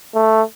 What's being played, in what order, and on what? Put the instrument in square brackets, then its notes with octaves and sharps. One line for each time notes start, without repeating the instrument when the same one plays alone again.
[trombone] A3